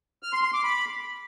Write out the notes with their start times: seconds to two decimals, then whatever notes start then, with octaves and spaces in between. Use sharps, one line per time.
0.23 F6
0.33 C6
0.43 C6
0.53 D6
0.63 B5